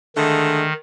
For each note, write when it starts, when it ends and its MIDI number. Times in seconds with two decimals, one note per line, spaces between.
0.16 0.66 50
0.16 0.73 51
0.16 0.66 56
0.16 0.66 57